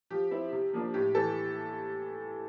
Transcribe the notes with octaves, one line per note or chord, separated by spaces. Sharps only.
F3 G4
C4 E4
C3
F3 A#3 D4
A2 G4
E3 A4